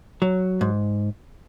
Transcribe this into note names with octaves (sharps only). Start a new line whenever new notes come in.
F#3
G#2